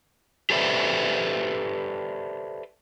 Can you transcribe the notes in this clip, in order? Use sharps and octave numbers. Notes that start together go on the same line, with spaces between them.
G4 A4 B4 C5 D5 E5